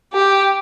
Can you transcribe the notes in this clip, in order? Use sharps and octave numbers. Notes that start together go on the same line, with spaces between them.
G4